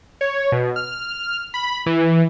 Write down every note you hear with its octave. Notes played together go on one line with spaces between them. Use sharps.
C#5
B2
F6
B5
E3